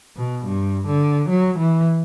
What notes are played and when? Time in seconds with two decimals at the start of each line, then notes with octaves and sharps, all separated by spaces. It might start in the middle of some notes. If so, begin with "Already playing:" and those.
0.16 B2
0.44 G2
0.87 D3
1.29 F#3
1.58 E3